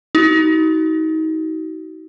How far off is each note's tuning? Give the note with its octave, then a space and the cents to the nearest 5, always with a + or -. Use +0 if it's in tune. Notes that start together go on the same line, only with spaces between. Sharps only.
D#4 +30 F#4 +30